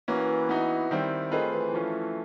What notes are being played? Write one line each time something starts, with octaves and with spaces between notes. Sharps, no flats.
E3 A#3 C#4 F#4
B3 D#4 F#4
D#3 G3 C4 E4
D#3 A3 C4 F4 G#4 B4
E3
F3 A3 C#4 F4